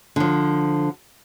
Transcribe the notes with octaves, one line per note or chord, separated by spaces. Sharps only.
D3 F3